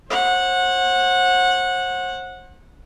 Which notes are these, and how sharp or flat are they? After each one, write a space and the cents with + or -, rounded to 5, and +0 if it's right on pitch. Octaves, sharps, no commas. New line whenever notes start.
C5 +40 F#5 -15